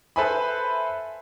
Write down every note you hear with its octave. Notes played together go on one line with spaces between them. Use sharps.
A4 B4 C5 E5 G#5 B5